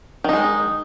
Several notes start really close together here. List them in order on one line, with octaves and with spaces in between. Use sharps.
D#3 D#4 G#3